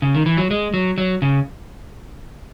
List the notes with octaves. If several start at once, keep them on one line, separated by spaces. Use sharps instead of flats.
C#3
D#3
E3
F#3
G#3
F#3
F#3
C#3